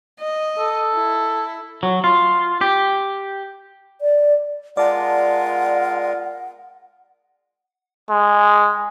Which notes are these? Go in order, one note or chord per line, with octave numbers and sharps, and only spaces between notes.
D#5
A4
E4
F#3
F4
G4
D5
G#3 F4 A#4 D5 F#5 A5
G#3